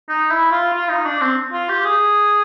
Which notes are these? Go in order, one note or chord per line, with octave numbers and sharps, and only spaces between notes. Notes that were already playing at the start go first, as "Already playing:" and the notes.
D#4
E4
F4
F4
D#4
D4
C4
F4
G4
G#4